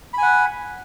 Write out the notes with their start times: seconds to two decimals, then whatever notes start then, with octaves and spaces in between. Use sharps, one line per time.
0.14 B5
0.18 G#5
0.23 F#5